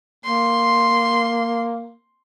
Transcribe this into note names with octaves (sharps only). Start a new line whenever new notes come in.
A#3 C6